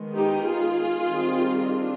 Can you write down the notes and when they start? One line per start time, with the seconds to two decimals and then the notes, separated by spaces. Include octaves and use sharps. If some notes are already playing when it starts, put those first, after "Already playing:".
Already playing: D#3 G#3 B3
0.15 D#4 G4
0.45 F4 G#4
1.04 D#3 G3 C4
1.62 D4 F4